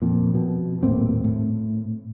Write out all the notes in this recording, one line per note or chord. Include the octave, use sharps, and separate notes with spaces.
F2 A#2
F2 B2
D#1 A2 A#3 C4
A2